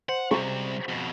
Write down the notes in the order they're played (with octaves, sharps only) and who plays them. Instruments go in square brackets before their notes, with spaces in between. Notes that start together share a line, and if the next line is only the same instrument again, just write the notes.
[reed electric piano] C5 [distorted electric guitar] F#5
[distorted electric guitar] C3 G3 [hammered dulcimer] C#6
[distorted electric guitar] F2 B2